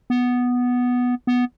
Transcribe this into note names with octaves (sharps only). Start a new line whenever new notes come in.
B3
B3